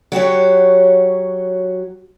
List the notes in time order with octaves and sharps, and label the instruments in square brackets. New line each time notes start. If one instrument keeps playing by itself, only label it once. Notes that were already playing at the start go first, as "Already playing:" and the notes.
[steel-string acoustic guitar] F#3 F#4 G4 C#5